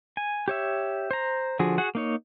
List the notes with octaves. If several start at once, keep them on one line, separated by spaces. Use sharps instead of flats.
G#5
G4 C#5 E5
C5 A#5
D3 F3 F#4 G#4
F#4 G#4 F#5
A#3 D#4 C#5